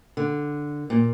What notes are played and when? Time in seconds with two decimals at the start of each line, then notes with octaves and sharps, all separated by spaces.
0.17 D3
0.90 A#2